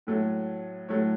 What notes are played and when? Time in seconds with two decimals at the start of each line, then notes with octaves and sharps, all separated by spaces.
0.07 A2 F#3 A3 A4
0.89 A2 F#3 A3 C#5